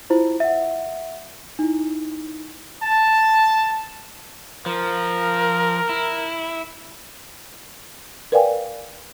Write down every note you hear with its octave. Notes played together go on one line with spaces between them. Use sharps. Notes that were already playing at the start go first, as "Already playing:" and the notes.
E4 F4 C5
E5 F#5
D#4 E4
A5
F3 A#4
E4
A#4 B4 D5 F5 G5 G#5